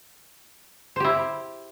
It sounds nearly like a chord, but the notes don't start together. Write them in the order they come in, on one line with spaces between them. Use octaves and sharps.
C5 G4 E4